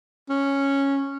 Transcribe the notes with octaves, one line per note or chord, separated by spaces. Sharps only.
C#4